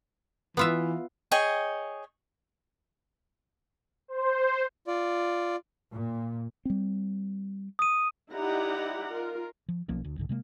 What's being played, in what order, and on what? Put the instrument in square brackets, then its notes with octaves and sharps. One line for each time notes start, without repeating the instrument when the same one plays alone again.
[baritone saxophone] E3 [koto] B3 F4 E5
[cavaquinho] G#4 C#5 D#5 G5
[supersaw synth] C5
[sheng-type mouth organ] F4 D5
[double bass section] A#2
[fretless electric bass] G3 C4
[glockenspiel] D#6 D#7
[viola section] D#4 E4 G4 D5 F#5 A#5
F4 A#4
[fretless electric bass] F3
B1 F3 A#3 C#4
D2
C2 G#2 D3
C3 G#3 A#3